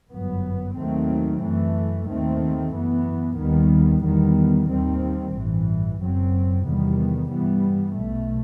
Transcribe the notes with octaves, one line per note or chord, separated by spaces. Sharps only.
G1 F#2 F#3 B3
D#2 D#3 F#3 A3 C4
F#2 E3 A3
D#2 D#3 A3 C4
F#2 E3 B3
D#2 D#3 G3 B3
E2 D#3 G3 B3
D#2 D#3 G3 C4
A1 G2 E3
F#1 F#2 F#3 C4
E2 C3 D#3 G3 B3
G2 E3 G3 B3
B1 B2 A3